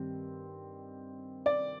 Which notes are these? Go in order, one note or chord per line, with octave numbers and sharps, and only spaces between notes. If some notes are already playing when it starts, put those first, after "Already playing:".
Already playing: G2 D#3 G3 C4
D5